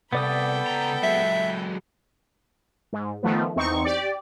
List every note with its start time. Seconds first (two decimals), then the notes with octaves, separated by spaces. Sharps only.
0.13 C2 B3 A4 D5 G5 B5 D#6
0.67 C#2 A#5
1.03 F#3 G#3 E5
2.93 G#2
3.23 D#3 F3 A3 B3
3.56 E2 C4 D#4 C#6
3.84 G4 D5